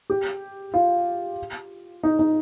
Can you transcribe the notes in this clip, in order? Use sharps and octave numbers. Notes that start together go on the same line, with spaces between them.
G4
F4
D#4
D#4